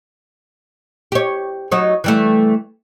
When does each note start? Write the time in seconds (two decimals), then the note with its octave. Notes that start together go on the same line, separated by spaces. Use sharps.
1.12 G4 C#5
1.72 F#3 D#4 C#5
2.04 E3 G3 A3